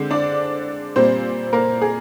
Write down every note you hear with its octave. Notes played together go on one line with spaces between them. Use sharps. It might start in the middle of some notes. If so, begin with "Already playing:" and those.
Already playing: D3 G#3 C4 C5
D4 D5
A#2 G3 A#3 C4 C5
A#3 A#4
G#4